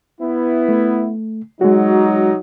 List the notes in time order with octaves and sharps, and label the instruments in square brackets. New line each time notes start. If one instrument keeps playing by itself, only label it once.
[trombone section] B3 E4
[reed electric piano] A3
[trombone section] F#3 D#4 [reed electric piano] G#3 F#4